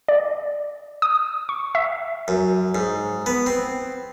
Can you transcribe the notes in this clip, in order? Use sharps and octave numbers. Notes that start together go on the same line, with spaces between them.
D5
D#6
C#6
E5
F#2
G#2
B3
C4